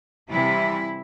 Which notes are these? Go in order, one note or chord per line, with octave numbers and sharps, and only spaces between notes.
C3 E3 G3 E4